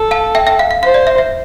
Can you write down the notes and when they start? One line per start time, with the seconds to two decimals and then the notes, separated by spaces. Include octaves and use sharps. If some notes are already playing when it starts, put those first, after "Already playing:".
Already playing: A4
0.11 F5 A5
0.35 E5 G5
0.47 E5 G5
0.59 F5
0.71 F5
0.83 C5 F5
0.94 D5
1.07 E5
1.18 E5